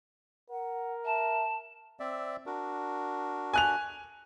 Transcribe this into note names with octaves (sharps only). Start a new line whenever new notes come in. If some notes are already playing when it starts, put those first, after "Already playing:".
A#4 F#5
E5 A5
C4 D5 E5
D4 F#4 A#4
G#5 F#6 F7